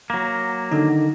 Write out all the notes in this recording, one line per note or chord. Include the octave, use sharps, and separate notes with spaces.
F#3 A#3
D3 D#3 D#4